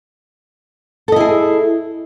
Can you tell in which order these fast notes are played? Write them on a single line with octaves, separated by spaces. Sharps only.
A4 D#5 E4 G#4